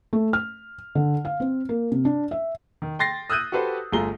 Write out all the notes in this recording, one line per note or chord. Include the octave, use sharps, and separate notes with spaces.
A3
F6
D3
F5
C4
A#3
C3
D4
E5
D#3
G5 C6 A6 A#6 C7
D#6 E6 F#6 G6 D#7
F#4 G4 A4 B4 C5
G1 A3 F4 G#4 A#5 G7